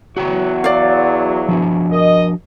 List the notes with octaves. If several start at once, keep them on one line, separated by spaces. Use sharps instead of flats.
E2 F#3 F#4 C#5 G5
D5 F5
F3 D4 F#4
A#4 D#5